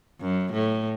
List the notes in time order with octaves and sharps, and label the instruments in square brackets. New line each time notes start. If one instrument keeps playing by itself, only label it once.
[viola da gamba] F#2
A2